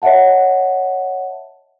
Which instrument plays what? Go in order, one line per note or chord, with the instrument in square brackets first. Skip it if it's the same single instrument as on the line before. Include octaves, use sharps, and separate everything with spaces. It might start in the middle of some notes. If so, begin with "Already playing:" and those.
[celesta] C#5 D#5 E5 F#5 A5